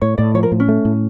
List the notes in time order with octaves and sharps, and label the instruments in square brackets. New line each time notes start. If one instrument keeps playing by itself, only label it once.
[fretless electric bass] A2 [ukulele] C#5
[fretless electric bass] A2 [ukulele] D5
[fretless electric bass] F3 [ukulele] C#5
[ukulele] A#4
[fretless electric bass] A2
[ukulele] C#4
[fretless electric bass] A3
A2